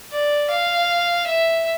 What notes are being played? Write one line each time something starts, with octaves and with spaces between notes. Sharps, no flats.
D5
F5
E5